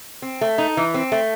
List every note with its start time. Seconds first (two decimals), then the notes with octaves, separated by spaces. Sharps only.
0.22 C4
0.41 A3
0.58 D#4
0.77 E3
0.94 C4
1.12 A3